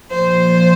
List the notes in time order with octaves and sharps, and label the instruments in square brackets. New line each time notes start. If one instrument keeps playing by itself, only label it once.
[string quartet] A#2 F3 C5